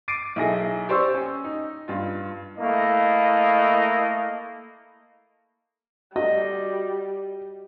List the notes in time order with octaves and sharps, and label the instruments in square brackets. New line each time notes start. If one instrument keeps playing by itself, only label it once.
[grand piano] D6 A6 C7 D7 D#7
B1 D#4 E4 G#4 A4 A#6
G4 C5 D5 C#6 E6
C#4
D#4
G2 F4
[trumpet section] A3 A#3 E4 D#5
[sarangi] G3 [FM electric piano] F#4 [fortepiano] D#5